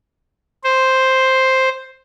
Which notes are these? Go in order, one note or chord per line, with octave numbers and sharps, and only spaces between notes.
C5